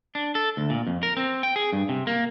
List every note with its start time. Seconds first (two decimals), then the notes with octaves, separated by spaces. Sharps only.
0.15 D4
0.35 A4
0.57 D2
0.70 A#2
0.87 F2
1.03 A#4
1.17 C4
1.43 G5
1.56 G#4
1.73 G2
1.89 C3
2.07 A#3